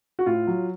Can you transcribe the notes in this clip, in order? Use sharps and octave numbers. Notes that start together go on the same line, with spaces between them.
F#4
A2 F4
F#3